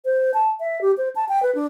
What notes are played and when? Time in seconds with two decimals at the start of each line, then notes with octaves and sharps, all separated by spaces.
0.05 C5
0.34 A5
0.60 E5
0.81 G4
0.98 C5
1.16 A5
1.29 G5
1.43 B4
1.55 D4